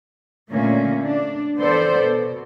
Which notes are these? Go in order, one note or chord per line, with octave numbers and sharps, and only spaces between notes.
A#2 D3 A3 A#3 C#4
D4
E3 B3 A4 C5 D5
B2